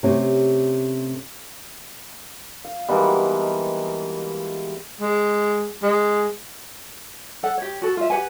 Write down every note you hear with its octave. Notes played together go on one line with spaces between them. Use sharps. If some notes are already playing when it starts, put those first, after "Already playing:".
C3 A3 C#4 G4 C#5
F5
B2 E3 G3 G#3 A#3 D#4
G#3
G#3
A4 F#5
G4 C#5
F#4 A4
F4 E5
G4 B4 F#5 G#5